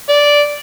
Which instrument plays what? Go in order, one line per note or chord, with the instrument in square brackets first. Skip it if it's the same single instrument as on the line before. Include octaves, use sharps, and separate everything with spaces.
[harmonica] D5